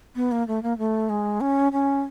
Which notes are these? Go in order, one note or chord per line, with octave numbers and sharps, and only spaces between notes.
B3
A#3
A3
A#3
A3
G#3
C#4
C#4